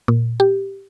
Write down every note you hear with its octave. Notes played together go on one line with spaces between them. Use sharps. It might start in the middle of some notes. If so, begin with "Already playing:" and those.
A#2
G4